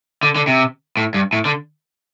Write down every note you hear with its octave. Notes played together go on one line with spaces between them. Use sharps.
D3
D3
C3
A2
G2
A2
D3